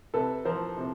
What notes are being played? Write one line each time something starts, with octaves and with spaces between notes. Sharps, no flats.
C3 A4 B4
F3 A#4 C5
C3